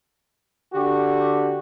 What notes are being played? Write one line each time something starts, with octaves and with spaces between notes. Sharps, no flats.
D3 F#4 G4